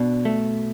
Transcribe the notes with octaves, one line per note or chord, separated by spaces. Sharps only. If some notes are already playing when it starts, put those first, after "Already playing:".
Already playing: B2 D4
A3